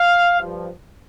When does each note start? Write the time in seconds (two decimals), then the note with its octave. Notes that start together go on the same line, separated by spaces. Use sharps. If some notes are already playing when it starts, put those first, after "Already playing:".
Already playing: F5
0.36 G2 F3